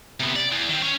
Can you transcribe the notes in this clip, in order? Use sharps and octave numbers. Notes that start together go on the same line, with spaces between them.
C3 B3
D5
E2
D#3 C4
C#4 C#5